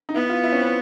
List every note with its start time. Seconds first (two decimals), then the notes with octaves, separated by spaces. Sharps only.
0.09 D#4
0.14 B3 E4
0.29 F4
0.44 E4
0.52 C#4
0.58 C4